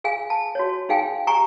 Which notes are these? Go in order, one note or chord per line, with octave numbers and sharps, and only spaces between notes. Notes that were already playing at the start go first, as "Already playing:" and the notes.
G#4 F5 G#5
A5
F#4 C#5
D#4 G#4 F5 G5 G#5
G4 G#5 A#5 C#6